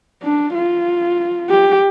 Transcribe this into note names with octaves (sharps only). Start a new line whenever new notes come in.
D4
F4
G4